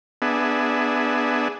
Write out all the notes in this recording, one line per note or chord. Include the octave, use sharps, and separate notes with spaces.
B3 D4 G#4 E5